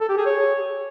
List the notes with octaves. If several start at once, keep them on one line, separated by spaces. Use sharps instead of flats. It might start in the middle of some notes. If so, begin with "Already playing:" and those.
A4
G4
G#4
C#5